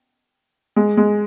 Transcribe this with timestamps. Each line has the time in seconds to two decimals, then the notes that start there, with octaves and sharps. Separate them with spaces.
0.76 G#3
0.97 G#3